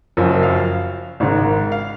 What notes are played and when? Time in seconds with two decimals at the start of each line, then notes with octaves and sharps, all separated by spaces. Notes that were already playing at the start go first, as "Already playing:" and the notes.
0.17 F#1 F#2 F3
0.43 F5
1.20 G#1 G#2 D#3
1.72 F5